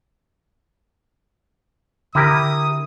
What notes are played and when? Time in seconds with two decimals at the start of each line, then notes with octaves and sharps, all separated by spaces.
2.15 D3 E4 G4 A#4 D#6